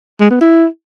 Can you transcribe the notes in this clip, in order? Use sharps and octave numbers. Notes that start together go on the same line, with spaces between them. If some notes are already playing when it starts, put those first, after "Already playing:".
G#3
B3
E4